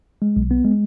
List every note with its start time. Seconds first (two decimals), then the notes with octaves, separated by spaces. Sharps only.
0.22 G#3
0.36 B1
0.51 B3
0.65 G#3